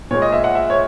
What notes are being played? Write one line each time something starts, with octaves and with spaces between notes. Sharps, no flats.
A#2 G#3 C#5
D#5
E5
F#5
E5
C#5